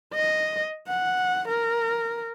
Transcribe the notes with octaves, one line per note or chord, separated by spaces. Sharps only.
D#5
F#5
A#4